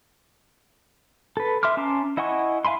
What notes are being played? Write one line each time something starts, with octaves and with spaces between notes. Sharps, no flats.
A4 B4
E5 C6 D6 F6
C#4 A5 A#5 C6 D6
E4 D#5 F#5 G#5 C#6
E5 F5 G#5 B5 C6